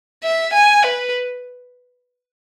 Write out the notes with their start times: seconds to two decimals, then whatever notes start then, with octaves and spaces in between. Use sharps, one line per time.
0.23 E5
0.53 G#5
0.84 B4